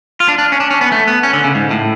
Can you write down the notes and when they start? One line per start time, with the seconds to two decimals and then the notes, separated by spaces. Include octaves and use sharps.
0.20 F4
0.28 D4
0.38 D4
0.52 C#4
0.60 D4
0.70 C#4
0.81 B3
0.92 A3
1.07 B3
1.23 C#4
1.33 D3
1.44 C#3
1.55 G#2
1.71 A2